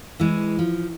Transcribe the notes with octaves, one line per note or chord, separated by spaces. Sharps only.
E3 G#3
F3